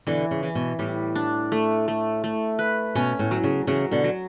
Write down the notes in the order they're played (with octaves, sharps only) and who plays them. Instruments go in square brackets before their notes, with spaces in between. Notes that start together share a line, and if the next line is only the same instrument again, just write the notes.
[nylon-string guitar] B2 D3 [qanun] E3
[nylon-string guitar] C#3
[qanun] E3
[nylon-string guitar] B2
[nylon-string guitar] A2 [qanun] G3
[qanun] D4
A3
A3
A3
B4
[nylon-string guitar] B2 [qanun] C#4
[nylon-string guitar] A2
[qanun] F#3
[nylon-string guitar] C#3
[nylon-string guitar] C#3 E3 [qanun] F#3
[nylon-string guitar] B2 D3
[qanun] F#3